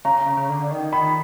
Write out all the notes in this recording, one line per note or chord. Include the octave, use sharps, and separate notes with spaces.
C#3 A#5
C#3
C#3
D3
D#3
D#3 B5